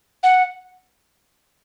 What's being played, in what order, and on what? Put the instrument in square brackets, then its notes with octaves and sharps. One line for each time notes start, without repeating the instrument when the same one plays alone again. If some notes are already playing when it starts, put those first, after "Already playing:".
[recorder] F#5